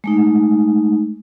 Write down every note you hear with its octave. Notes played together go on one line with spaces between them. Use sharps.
G#3 A3 D#4